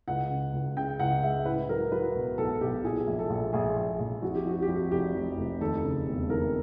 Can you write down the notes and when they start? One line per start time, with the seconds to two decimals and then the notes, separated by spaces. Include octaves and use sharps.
0.08 C#2 F#5
0.30 C#3
0.53 C#2
0.77 C#3 G5
1.00 C#2 F#5
1.23 G#3 E5
1.45 A2 B4
1.69 F#3 A#4
1.92 F#3 B4
2.15 B1
2.38 B1 A4
2.61 B1 G4
2.84 A#2 G#4
3.07 A#1
3.19 A4
3.30 A#1
3.53 A#1 G#4
3.76 A#1
4.00 A#1
4.22 F2 F#4
4.35 G4
4.46 F2 F#4
4.62 G4
4.69 F2
4.76 F#4
4.91 F1 G4
5.15 F2
5.37 F1
5.61 D#2 A4
5.84 C#3
6.06 E1
6.30 D#2 A#4